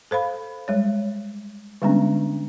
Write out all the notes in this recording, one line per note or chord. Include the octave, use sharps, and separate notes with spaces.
A4 C5 F5 B5
G3 G#3 C#5
D3 G3 G#3 B3 C#4 D4